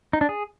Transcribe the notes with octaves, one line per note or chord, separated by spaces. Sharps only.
D#4
D4
G#4